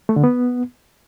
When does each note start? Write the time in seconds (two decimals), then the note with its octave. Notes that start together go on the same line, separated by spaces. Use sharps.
0.09 A3
0.16 D3
0.24 B3